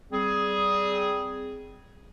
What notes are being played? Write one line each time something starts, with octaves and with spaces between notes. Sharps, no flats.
G3 C4 G#4